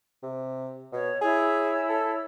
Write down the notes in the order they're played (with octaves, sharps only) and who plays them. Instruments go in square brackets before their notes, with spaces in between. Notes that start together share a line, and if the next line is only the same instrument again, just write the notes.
[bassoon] C3
[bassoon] B2 [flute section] C#5
[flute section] E4 C#5 E6 [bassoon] G#4
[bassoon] A4